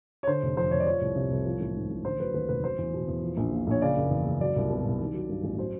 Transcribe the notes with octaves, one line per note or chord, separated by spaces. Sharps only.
C#5
D3 C5
F1
F2 C5
F1 C#5
D5
F3 C#5
C2
C3
C2
F3
A1
G#2
A1
D3 C5
F#3 B4
D#2 B4
F1 B4
F#3 C5
E2
B2
E2
F3
A#1
A#2
A#1 C#5
C#3 D5
F#1
E2
F#1
F#3 D5
C2
B2
C2
D#3
F#3
G2
A1
F#3 C5